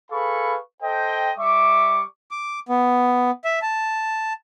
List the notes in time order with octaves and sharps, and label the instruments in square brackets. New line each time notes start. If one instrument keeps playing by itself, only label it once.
[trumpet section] G#4 A4 B4 F5 B5 C#6
A4 C5 D#5 G5
G3 E5 C#6 D6
[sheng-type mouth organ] D6
B3
E5
A5